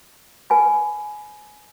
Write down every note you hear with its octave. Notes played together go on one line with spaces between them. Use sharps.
B4 G#5 B5